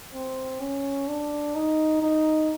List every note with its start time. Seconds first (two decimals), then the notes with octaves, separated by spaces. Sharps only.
0.14 C4
0.61 C#4
1.08 D4
1.55 D#4
2.02 D#4